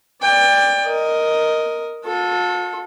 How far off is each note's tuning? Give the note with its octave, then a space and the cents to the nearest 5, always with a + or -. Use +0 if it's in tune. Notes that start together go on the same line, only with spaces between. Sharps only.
D5 +0 G5 +30
A#4 +0 D#5 +5
F4 +45 A4 +0